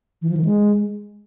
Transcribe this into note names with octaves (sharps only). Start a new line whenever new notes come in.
E3
F3
D#3
G#3